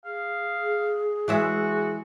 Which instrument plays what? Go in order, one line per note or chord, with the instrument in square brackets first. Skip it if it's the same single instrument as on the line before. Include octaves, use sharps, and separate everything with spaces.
[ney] G#4 [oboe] F5
[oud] E3 G#3 E5 [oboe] F#4